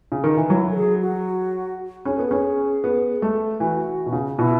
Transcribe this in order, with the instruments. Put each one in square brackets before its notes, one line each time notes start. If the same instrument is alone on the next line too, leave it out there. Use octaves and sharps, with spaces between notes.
[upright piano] C#3
D#3
E3
[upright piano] F#3 [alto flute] E4
[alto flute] A4
G#4
F#4
[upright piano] C#4 [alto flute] G#4
[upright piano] B3 [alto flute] A4
[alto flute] G#4
[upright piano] C#4
B3
A3
[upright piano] E3 [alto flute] F#4
[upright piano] B2
C#3
[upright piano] B2 [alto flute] E4